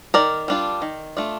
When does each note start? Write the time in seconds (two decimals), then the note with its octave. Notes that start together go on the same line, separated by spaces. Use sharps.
0.14 D#3 A#4 D5
0.48 G3 D4 F4
0.82 D#3
1.17 A3 D4 F4